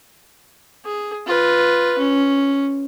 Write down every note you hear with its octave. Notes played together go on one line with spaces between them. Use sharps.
G#4
F4 B4
C#4